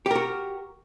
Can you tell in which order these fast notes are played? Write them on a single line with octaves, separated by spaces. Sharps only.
G4 A#4 F#4